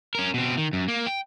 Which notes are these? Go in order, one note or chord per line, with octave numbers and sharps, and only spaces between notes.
C#4 A#4
B2 C4
D#3
F#2
A#3
G5